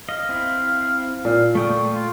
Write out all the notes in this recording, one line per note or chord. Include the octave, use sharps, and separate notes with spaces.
D#5 F5
C4 E4
A#2 F5
A3 G5 C#6 D#6
F4